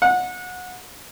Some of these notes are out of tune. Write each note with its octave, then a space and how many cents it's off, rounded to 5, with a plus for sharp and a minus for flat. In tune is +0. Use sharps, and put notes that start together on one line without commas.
F#5 -25